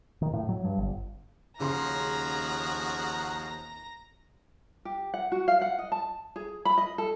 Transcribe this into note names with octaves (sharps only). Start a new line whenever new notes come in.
D#3
A2
F#3
G2
G1
D#2 C#3 F3 F#4 G#4 A#5 C6
G4
F#5
F#4
F5
F#5
D#5
A5
G#4
B5
D#5
A4